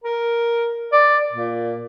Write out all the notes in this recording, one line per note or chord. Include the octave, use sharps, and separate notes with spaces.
A#4
D5
A#2